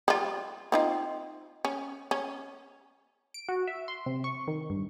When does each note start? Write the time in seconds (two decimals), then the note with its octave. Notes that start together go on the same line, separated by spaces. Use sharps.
0.08 G3 F4
0.72 C4 D#4 F4
1.65 C#4
2.11 C#4
3.34 D7
3.49 F#4
3.67 E5
3.88 C6
4.06 C3
4.24 C#6
4.48 D#3
4.70 G2